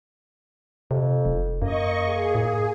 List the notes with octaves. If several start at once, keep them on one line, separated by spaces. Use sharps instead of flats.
F2 C3
F1
F#2 A#3 D#5 C#6
G#4
A2